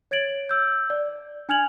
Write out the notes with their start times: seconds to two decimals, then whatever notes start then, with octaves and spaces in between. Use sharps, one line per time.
0.11 C#5 G#6 A6 D7 F#7
0.49 E6 G6
0.90 D5
1.49 D4 G#5 F6 G#6 F7 F#7